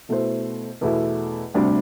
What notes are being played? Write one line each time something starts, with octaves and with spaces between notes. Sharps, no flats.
B2 A3 E4 A4 C5
E2 B2 A3 E4
D2 C3 G3 D4